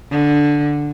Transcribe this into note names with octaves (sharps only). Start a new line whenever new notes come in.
D3